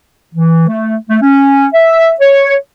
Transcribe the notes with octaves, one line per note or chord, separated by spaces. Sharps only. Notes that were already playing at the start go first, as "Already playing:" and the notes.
E3
A3
A3
C#4
E5
C#5